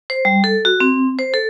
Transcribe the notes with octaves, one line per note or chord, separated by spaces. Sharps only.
C5
G3
A4
F#4
C4
C5
A4